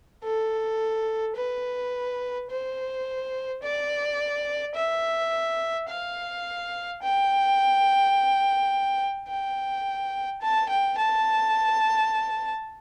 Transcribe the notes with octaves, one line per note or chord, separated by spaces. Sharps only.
A4
B4
C5
D5
E5
F5
G5
G5
A5
G5
A5